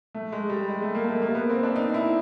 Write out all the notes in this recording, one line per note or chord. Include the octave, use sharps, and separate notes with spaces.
A3
G#3
G3
G#3
A3
A#3
A3
A#3
B3
C4
D4
D#4
E4